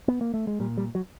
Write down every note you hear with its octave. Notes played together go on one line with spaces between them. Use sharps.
B3
A#3
A3
G#3
A#2 G3
G3
F#3